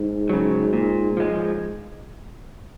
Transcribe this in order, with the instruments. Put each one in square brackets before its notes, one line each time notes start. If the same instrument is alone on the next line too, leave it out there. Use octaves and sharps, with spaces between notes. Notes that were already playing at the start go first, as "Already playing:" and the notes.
Already playing: [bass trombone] G#2
[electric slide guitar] C#3 F#3
A#2
F3 G#3